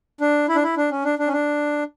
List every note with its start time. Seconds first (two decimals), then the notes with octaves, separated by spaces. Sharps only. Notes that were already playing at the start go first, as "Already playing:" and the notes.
0.21 D4
0.49 E4
0.56 D4
0.63 E4
0.77 D4
0.91 C#4
1.05 D4
1.19 D4
1.28 C#4
1.33 D4